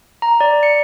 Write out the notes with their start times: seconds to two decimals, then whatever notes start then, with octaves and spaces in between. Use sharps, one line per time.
0.22 A#5
0.41 D5
0.63 C#7